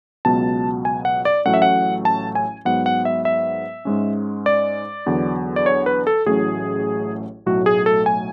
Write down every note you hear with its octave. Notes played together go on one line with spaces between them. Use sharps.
C#2 B2 F#3 B3 A5
G#5
F#5
D5
A1 A2 F#3 A3 C#4 F#5
E5
F#5
A5
G#5
G#2 F#3 B3 F#5
F#5
E5
E5
G#2 G#3 C#4
D5
E2 D3 F#3 B3
D5
C#5
B4
A4
A1 A2 F#3 A3 C#4 G#4
B1 A2 F#3 A3 F#4
G#4
A4
G#5